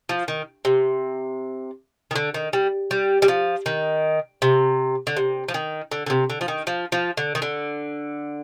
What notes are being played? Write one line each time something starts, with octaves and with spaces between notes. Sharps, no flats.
F3
D#3
C3
D#3
D3
D#3
G3
G3
G3
F3
D#3
C3
D3
C3
F3
D#3
D3
D3
C3
D3
F3
D#3
F3
F3
D3
D#3
D3